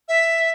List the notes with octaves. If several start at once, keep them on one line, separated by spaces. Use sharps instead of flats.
E5